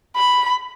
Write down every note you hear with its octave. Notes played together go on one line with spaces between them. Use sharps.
B5